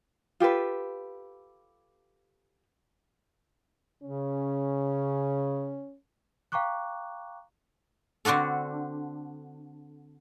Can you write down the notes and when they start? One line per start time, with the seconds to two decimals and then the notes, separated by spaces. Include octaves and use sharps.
0.40 F4 G4 A4 B4
4.03 C#3 C#4
6.52 F5 G5 A#5 C#6 D6 F#6
8.25 D3 C4 D4 F#4 A4